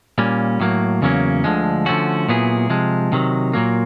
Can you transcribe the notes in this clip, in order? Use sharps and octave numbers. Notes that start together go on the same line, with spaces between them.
A#2 G3 A#3 C#4
A2 F#3 A#3
E2 C#3 F#3 A#3 C#4
D2 D3 F3 G#3
D3 F3 A3 C#4 F#4
A#2 F#3 B3 E4 G#4
C3 F3 G#3
C3 D#3 F#3
A#2 F#3 A#3